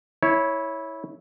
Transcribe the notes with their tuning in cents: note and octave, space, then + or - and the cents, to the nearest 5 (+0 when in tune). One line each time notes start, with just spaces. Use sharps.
E4 -15 C#5 +0